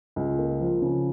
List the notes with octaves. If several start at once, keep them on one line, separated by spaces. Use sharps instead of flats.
C#2
A#3
F3
C#3